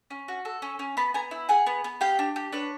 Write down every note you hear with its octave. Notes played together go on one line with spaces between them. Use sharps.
C#4
F#4
A4
C#4
C#4
B3 A5 B5
B3 G#5 A#5
E4
G#4 F#5 G#5
B3
B3
G4 F5 G5
D4
G4
D4 B4 C#5